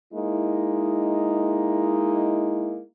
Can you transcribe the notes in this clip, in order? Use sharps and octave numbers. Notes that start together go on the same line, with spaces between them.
G#3 A#3 D#4 E4